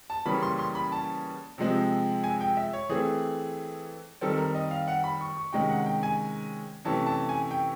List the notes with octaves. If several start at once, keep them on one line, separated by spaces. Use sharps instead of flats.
A5
C#3 E3 G3 A#3 C#4 B5
C6
C6
B5
A5
C3 F3 G#3 C4
G#5
G5
E5
C#5
E3 A3 C4 G#4
D#3 G3 C4 A4
A#4
D#5
F5
F#5
B5
C#6
C#6
C3 D#3 G#3 C#4 G5
F#5
G5
G#5
C3 E3 A3 C#4 A5
A5
G#5
G5